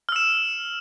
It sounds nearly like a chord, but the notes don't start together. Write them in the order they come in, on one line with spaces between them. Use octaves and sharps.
F6 E6 E7